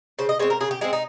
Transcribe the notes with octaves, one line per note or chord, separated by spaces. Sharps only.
C#3 C5
D#5
G#3 C4 C#5
A#4
C#3 G#4
G4
G#3 C4 G#4
D#4